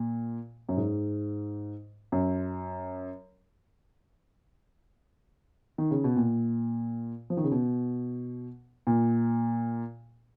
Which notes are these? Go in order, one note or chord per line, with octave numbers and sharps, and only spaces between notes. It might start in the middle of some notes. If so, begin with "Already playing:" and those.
Already playing: A#2
F#2
G#2
F#2
D#3
C#3
B2
A#2
F3
D#3
C#3
B2
A#2